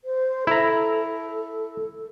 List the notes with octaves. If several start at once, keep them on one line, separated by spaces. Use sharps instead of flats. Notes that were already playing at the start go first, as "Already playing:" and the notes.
C5
E4 A4 A#5